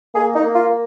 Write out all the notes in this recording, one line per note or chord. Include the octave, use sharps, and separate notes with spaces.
A#3 G#4
D#4
A#3
F4
A#3